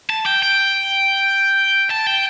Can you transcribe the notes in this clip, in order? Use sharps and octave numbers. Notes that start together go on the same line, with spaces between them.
A5
G5
G5
A5
G5